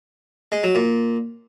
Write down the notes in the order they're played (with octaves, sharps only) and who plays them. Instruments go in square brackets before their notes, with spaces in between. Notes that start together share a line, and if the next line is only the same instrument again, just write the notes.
[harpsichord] G#3
F#3
A#2